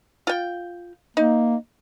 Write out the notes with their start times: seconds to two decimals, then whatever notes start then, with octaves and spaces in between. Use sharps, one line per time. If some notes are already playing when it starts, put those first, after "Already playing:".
0.27 F4 G5
1.17 A#3 D#4